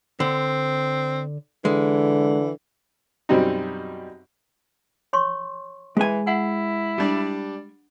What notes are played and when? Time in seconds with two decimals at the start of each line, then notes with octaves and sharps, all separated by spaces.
0.20 D3 C4
1.65 D3 E3 G#3
3.29 F#2 B2 G3 C4 D#4
5.13 C#5 C6 C#6
5.97 E3 G#3 G#5
6.27 E4 F#5
6.98 G3 D4